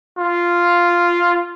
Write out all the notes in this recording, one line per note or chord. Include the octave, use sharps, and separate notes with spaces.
F4